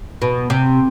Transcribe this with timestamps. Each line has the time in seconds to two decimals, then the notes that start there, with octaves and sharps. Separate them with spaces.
0.22 B2
0.50 C3